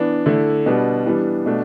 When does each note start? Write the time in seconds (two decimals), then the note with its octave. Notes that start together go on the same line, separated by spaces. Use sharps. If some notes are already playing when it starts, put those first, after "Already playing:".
Already playing: E3 B3 D4
0.26 D3 A3 E4
0.66 B2 G3 B3 D4
1.06 E3 G3 B3 D4
1.46 B2 A3 D4